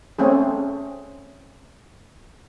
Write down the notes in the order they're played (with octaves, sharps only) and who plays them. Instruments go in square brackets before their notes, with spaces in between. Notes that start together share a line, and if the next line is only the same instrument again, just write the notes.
[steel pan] A3 C4 C#4 G#4